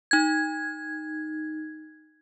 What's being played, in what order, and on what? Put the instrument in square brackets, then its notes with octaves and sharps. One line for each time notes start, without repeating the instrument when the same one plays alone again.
[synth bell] D#4 G#6